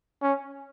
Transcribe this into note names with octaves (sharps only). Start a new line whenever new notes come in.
C#4